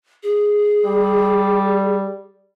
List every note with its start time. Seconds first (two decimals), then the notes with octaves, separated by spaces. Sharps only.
0.23 G#4
0.85 G3